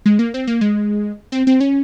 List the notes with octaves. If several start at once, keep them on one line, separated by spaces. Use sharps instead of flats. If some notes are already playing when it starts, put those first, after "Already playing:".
G#3
A#3
C4
A#3
G#3
C4
C4
C#4